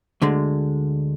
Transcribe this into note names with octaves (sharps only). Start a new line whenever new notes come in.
D2 D3 G#3